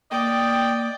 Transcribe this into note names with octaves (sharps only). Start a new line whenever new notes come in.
A#3 D5 D#5 G5